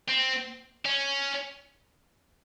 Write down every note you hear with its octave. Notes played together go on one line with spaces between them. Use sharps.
C4
C#4